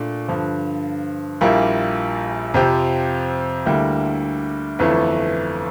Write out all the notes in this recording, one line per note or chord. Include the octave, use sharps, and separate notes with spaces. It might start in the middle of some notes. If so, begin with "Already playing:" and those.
Already playing: A#2 A3 D4
G2 D3 F3
A#1 A#2 G3 A#3 E4
F2 C3 F3 C4 G4
D2 D3 G3 A#3 E4
G1 F2 E3 A3 E4